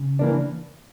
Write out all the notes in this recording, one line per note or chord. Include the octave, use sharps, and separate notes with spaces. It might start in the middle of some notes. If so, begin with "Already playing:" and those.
Already playing: C#3
E3 A#3 D4